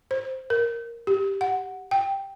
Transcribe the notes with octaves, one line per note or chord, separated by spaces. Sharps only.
C5
A#4
G4
F#5
G5